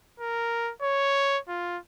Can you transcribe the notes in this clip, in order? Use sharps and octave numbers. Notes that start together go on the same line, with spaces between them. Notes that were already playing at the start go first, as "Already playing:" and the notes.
A#4
C#5
F4